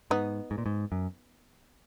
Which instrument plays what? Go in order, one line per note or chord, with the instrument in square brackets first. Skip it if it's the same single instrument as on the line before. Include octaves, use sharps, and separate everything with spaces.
[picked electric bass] G#2 [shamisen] B3 D#4
[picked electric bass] G#2
A#2
G#2
F#2